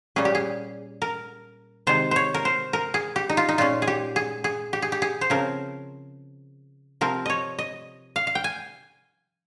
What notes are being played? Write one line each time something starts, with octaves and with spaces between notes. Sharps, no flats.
A#2 G3 A#3 C#4 G#4
G4
G#4
A#4
C3 D#3 G#3 C5
C5 C#5
A#4
C5
A#4
G#4
G4
D#4
F4
D#4
A#2 G#3 C#4 F4
G#4
G4
G#4
G#4
G4
G#4
G4
G#4
C5
C#3 F3 C4 A#4
C3 F3 C4 A#4
C#5 D#5
D#5
F5
F5
G5
G#5